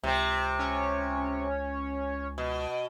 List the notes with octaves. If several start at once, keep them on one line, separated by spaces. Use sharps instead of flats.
C#2 C3 C4
C#4 C#5
B2